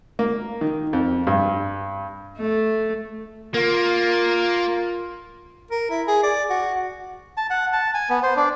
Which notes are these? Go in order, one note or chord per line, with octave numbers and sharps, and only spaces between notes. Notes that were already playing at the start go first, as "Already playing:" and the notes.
A#3
D#3
F2
G2
A3
A#3 F4 A#4
A#4
E4
G#4
D5
F#4
A5
F#5
A5
G#5
B3
C5
D4